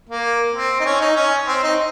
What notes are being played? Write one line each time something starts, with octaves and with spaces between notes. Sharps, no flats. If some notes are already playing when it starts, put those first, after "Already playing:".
A#3
C4
D#4
C#4
D#4
C#4
C4
D#4